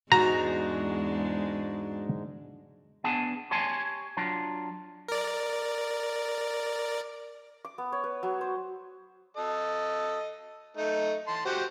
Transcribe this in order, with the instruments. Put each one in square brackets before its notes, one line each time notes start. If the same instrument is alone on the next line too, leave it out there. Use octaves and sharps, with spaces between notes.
[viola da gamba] E2 G#3 D4 [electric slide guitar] G#2 [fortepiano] F#4 [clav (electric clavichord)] A#5
[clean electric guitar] B3 D4 G#4 G#5 A5
G4 C#5 G#5 A5 C6
F#3 D4 F4
[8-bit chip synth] A#4 D5
[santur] D6
B3
C#5
B4
F#3
C5
[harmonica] A4 D#5
A3 D#4
A5 C6
F#4 G4 C5